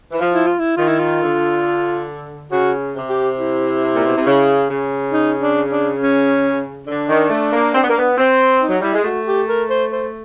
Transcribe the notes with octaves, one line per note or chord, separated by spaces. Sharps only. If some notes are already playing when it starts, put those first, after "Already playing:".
E3
F3
E4
F4
E4
D#3 F4
E4
F4
D3
C#3 F#4
C3
G4
E4
A#2
B2
C3
C#3
C#3
D#4
D4
D4
C#4
D3 D4
D#3
A3
A#3
C4
B3
A#3
B3
C4
D#4
F#3
G3 E4
G#3
A3 F#4
G4
A#4
C5
C5